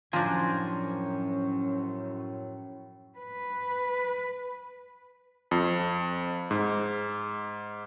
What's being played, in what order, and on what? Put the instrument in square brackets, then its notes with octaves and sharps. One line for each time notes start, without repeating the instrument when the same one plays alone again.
[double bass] F#2 C#4 [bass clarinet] A2 [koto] F3 D4 [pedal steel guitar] C5 G#5 A#5
[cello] B4
[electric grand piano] F2
G#2